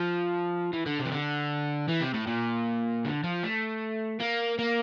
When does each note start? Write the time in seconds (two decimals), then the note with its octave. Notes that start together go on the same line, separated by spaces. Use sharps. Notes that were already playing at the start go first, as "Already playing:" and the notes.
Already playing: F3
0.73 E3
0.86 D3
0.99 C3
1.05 E3
1.12 D3
1.89 E3
2.01 C3
2.14 A2
2.27 A#2
3.05 D3
3.24 F3
3.44 A3
4.20 A#3
4.59 A#3